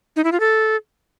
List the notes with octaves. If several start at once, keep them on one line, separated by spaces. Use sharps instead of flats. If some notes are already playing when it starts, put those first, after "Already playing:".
D#4
E4
F4
A4